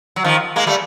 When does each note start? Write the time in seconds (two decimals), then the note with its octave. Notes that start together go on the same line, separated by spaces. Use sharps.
0.16 F#3
0.24 D#3 F3
0.56 G#3 A#3
0.67 G3 A3